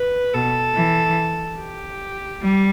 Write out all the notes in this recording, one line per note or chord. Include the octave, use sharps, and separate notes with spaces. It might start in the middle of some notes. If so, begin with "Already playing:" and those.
Already playing: B4
B2 A4
E3
G4
G3